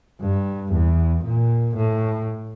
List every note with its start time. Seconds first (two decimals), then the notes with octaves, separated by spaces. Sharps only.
0.21 G2
0.73 E2
1.25 A#2
1.76 A2